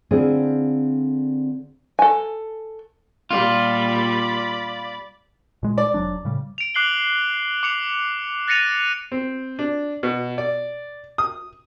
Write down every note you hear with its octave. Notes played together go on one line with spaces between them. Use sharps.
D3 C4 E4 F4 G#4
A4 G#5
A#2 G3 F4 D5 B5
A#2 G#3
D5
F1 F#3 D4
A2 C#3 G3
D7 F7
D6 F#6 C7 F#7 G7
D6 C#7 F7
F#6 A6 A#6 C#7 D#7 F7
C4
D4
B2
D5
D#6